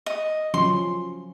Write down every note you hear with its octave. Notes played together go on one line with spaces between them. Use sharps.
D#5
F3 F#3 C#4 C6